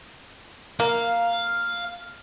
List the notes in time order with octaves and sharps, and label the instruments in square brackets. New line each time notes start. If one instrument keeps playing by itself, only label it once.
[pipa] A#3 [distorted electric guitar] F5